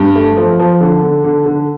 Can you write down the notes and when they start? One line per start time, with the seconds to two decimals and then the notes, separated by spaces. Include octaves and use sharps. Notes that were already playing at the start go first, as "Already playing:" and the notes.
Already playing: G2
0.16 A3
0.37 F3
0.59 F3
0.81 D3
1.02 D3
1.24 D3
1.46 D3